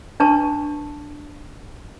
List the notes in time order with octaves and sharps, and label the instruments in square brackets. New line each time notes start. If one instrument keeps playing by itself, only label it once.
[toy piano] D4 B4 A5 C#6